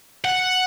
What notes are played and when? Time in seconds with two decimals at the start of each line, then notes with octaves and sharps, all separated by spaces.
0.25 F#5